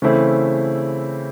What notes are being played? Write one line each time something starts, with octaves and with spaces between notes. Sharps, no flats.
C#3 E3 A3 C4 E4